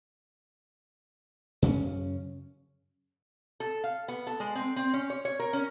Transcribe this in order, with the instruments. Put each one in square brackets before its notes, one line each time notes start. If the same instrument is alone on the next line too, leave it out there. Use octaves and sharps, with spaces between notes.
[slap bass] F#2 C#3 C#4
[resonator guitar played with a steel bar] A4
F5
B3
A4
G#3
C4
C4
C#4
C#5
C#5
A#4
C#4